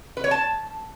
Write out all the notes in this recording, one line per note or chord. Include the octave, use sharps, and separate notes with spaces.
B4
C#5
A5